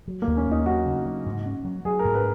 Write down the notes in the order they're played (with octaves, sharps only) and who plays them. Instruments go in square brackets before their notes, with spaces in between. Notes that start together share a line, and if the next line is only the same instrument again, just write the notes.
[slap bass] F#3
[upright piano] A#3
[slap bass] D#2
[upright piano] C#4
[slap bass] D#2 [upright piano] D#4
[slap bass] F#3 [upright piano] F#4
[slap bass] C#3
F#3
G#2
C#4
F#3
[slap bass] F#3 [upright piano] G#4
[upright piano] A#4
[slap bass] G#2
[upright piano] B4